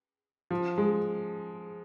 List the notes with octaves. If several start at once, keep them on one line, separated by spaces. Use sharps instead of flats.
F3
G#3